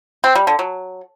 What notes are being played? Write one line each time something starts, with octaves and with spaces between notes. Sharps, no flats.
C4
G3
D3
F#3